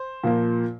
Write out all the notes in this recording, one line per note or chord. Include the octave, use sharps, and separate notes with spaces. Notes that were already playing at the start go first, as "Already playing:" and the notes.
Already playing: C5
A#2 F3 A#3